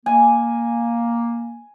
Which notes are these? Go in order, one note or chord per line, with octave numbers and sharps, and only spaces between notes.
A#3 G#5